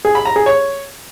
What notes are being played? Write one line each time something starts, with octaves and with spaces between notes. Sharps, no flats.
G#4
B5
A#5
G#4
C#5